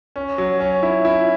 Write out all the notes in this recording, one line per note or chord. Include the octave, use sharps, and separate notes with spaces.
C#4
F#3
C#4
E4
E4